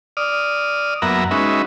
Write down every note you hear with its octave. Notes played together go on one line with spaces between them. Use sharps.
D5 D#6 F6
F#2 A#3 B3 E5 F#5 A#5
G#3 C#4 D#4 F#4 B4 E5